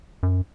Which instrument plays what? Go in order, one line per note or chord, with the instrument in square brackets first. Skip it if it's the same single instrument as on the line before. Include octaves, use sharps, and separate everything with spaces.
[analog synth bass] F#2